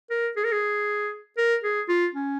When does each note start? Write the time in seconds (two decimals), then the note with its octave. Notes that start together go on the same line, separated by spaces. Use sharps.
0.10 A#4
0.36 G#4
0.44 A#4
0.52 G#4
1.38 A#4
1.64 G#4
1.89 F4
2.15 C#4